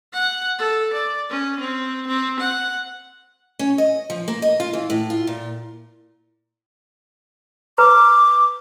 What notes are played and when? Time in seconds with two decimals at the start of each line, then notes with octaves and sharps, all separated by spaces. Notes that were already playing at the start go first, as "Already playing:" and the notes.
0.13 F#5
0.59 A4
0.94 D5
1.30 C#4
1.60 C4
2.07 C4
2.40 F#5
3.59 C#4
3.78 D#5
4.10 F3
4.28 A#3
4.42 D#5
4.60 F4
4.73 E3
4.90 A2
5.10 F4
5.27 A#2
7.78 B4 A#5 D6